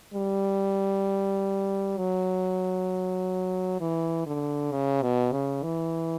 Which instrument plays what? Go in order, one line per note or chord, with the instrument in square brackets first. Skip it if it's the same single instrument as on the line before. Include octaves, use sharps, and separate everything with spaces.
[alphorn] G3
F#3
E3
D3
C#3
B2
C#3
E3